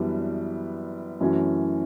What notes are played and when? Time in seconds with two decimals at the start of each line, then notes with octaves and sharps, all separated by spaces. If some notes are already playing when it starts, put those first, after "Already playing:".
Already playing: F#2 E3 G3 B3 D4
1.20 F#2 E3 A3 C#4 F#4